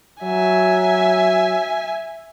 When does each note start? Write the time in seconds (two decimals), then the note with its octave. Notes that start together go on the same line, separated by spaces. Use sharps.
0.23 F#3 E5 G#5